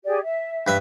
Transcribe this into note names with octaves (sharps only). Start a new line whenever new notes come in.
G4 G#4 D5
E5
G2 B4 E5